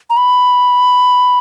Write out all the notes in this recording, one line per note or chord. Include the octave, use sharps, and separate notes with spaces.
A#5
B5